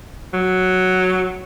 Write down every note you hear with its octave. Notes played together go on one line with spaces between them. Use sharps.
F#3